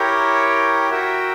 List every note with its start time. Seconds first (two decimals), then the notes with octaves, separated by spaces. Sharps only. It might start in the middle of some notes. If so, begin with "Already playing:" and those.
Already playing: E4 G4 A#4 C#5 G5
0.91 F#4 A#4 E5 G5